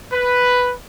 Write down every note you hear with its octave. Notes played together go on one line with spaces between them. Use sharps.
B4